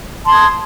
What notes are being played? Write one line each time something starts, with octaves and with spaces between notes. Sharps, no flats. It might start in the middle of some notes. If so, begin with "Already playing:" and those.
A5 C6 D#6 G#6